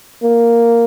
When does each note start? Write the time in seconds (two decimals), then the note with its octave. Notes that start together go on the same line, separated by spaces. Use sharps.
0.23 A#3